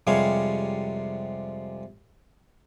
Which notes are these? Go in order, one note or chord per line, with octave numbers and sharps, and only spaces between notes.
F2 C3 G3 G#3 C#5 F5